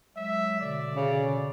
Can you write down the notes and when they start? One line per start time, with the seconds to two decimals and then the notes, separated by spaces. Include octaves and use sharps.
0.16 F#3 G#3 E5
0.60 B2 D3 D5
0.95 C#3